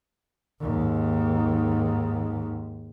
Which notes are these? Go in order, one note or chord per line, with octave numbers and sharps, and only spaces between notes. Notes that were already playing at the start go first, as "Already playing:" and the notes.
D#2 G#2